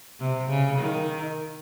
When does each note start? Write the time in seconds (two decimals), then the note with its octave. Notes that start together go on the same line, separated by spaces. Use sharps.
0.19 C3
0.49 C#3
0.79 D#3